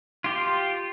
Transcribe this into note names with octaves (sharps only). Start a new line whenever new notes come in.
F4 G4